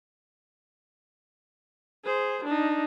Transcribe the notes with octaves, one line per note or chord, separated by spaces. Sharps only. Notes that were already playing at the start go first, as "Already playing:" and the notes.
G#4 C5
D4 D#4